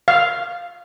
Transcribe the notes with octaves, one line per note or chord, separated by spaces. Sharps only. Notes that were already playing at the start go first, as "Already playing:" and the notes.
F5